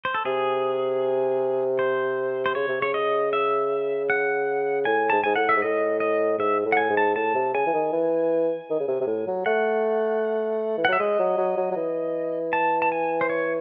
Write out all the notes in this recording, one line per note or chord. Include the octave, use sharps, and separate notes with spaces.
C5
A4
C3 G#4
C5
C5
C#3 C#5
C3
C#3 C#5
D#5
E5
F#5
A2 G#5
G#2 A5
G#2 G#5
A2 F#5
E5
G#2
A2 D#5
D#5
G#2 E5
A2
F#5
G#5
G#2
A5
A2 A5
C3
C#3 G#5
E3
D#3
E3
D#3
C#3
C3
C3
A2
F#3
A3 F#5
E3
F#5
F#3 E5
G#3 D#5
F#3
F#3
F#3
F#3
E3
A5
A5
G#5
C5
C#5